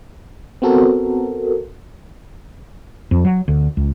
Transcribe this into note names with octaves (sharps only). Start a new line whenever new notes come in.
B3 C4 F#4 A4 A#4
F2
F#3
D2
C#2